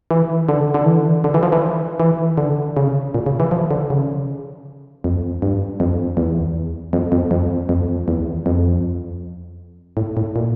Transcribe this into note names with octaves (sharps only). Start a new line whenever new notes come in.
E3
D3
D3
E3
D3
E3
F3
E3
E3
D3
C#3
A#2
C#3
E3
F3
D3
C#3
F2
G2
F2
E2
F2
F2
F2
F2
E2
F2
A2
A2
A#2